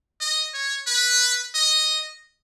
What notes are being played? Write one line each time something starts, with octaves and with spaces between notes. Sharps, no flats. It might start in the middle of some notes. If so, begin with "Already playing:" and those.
D#5
C#5
B4
D#5